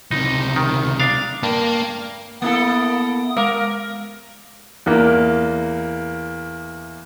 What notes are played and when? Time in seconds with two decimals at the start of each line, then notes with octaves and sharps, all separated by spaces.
0.11 C#2 C3 D#4
0.56 D#3
1.00 D4 F5
1.43 G2 A#3
2.42 A#3 B3 E4 A4 D#6
3.37 G#3 A#4 F5 D6
4.86 E2 A#3